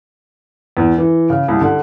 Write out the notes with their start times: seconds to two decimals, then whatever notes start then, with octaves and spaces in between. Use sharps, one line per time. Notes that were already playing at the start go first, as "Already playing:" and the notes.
0.77 E2
0.98 E3
1.30 C#3
1.48 C2
1.61 D3